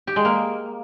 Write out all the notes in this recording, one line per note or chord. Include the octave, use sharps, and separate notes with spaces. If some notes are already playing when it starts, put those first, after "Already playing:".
G4
G#3
A#3